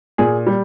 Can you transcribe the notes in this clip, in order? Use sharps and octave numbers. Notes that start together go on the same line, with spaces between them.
A#2 G#4
G3